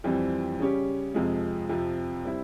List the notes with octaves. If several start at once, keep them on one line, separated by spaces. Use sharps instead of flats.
F2 E3 G3 C4
C#3 G3 C#4 G4
F2 C3 F3 G#3
F2 C3 F3
G3 C4 E4